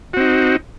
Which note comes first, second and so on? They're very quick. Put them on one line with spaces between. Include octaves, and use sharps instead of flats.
F#4 C4 D#4